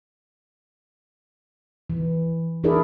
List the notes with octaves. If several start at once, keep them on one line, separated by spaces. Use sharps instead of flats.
E3
E3 D4 E4 G#4 A#4 D5